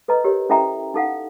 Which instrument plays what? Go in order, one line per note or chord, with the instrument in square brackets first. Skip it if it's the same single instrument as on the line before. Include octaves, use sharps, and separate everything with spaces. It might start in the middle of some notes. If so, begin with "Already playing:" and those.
[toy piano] A4 B4 D#5 A#5
G4 A#4 C#5
C#4 E4 A4 E5 G5 A#5
D#4 A4 F5 F#5